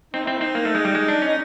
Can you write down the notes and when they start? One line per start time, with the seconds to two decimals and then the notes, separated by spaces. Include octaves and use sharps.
0.14 C4 D#4
0.26 C4 E4
0.40 C4 D#4
0.55 A#3
0.65 A3
0.75 G#3
0.85 G3
0.95 G#3
1.08 D4
1.22 C#4
1.29 D#4